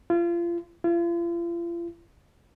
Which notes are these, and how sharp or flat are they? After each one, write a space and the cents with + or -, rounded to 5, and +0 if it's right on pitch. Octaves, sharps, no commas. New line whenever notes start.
F4 -30
F4 -40